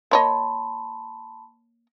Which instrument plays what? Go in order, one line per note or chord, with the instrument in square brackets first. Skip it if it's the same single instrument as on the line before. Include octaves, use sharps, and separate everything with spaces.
[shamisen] A#3 C#5 D#5 [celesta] A5 B5 C6